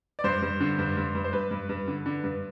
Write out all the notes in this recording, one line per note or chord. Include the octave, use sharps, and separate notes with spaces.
D5
G2 C5
G2
D3
G2
G2
G2
C5
G2 B4
G2
G2
D3
D3
G2